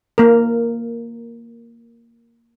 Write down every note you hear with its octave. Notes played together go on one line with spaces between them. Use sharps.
A#3 A#4